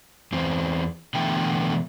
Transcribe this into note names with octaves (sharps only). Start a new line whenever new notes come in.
E2 C4
B2 D3 E3 A3 G5